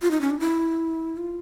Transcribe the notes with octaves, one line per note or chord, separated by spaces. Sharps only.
F4
D#4
C#4
D4
E4
F4